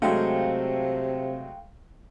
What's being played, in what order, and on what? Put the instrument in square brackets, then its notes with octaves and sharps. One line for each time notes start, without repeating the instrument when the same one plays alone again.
[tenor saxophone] C3 [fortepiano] F#3 G#3 A3 [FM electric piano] F5 G5